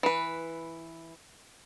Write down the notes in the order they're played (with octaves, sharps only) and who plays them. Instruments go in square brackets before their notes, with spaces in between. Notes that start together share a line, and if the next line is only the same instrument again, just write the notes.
[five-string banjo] E3 B4